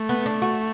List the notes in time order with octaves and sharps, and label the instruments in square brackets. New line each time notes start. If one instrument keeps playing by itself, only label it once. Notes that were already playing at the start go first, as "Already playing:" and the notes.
Already playing: [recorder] A3
[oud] B3
D4
F#4